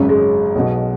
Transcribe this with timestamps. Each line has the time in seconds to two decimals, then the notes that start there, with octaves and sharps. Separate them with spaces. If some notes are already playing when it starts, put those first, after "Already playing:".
Already playing: G#1 F#2 C#3
0.09 G#3
0.55 B1 B2